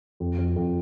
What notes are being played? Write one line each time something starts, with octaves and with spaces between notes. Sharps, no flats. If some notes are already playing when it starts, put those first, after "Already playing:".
F2
F2
F2